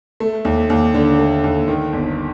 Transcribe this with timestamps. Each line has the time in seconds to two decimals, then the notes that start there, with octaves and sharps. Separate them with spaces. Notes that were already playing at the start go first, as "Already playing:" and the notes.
0.20 A3
0.45 D#2
0.70 D#2
0.94 D3
1.19 A3
1.44 D#2
1.68 D#3
1.93 G1